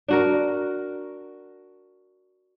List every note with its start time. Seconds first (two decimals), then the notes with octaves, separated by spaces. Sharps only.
0.08 D4 F#4 A#4